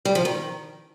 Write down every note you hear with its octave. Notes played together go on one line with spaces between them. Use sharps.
G3
F3
D#3